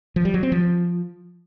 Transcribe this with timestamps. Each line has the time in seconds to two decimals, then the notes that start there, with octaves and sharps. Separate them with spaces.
0.16 F3
0.25 G3
0.34 F#3
0.43 C4
0.52 F3